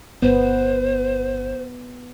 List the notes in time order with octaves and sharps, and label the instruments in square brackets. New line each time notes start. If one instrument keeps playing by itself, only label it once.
[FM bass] G1 [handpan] B3 [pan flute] C5